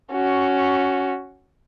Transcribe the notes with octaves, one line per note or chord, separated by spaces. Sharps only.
C#4 F#4